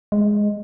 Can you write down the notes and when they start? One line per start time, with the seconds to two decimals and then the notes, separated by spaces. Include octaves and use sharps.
0.12 G#3